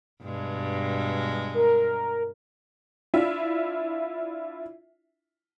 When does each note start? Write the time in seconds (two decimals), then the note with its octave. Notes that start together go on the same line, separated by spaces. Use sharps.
0.23 G2 B2 G#3
1.54 A#4
3.14 D4 E4 F4 E5